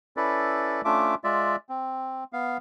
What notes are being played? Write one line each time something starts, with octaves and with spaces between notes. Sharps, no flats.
C#4 E4 A4 B4 D5
A3 C#4 D4 F4 E5 D6
G#3 F4 D5 E5
C4
B3 F5